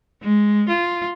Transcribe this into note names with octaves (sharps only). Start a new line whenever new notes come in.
G#3
F4